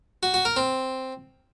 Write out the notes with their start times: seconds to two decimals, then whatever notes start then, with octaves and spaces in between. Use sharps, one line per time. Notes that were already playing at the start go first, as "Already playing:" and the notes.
0.23 F#4
0.34 F#4
0.45 A#4
0.56 C4